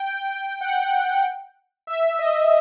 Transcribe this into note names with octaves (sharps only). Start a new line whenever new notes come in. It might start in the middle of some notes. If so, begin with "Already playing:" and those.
Already playing: G5
F#5
E5
D#5